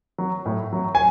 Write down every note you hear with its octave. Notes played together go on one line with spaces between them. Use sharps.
F#3
A2
F#3
G#5